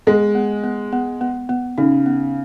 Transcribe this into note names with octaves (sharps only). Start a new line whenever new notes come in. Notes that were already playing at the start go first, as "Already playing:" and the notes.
G#3 B3
B3
B3
B3
B3
B3
C#3 D#4
B3